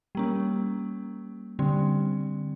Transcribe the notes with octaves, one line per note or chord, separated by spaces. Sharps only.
G3 A#3 C#4
D3 G3 C4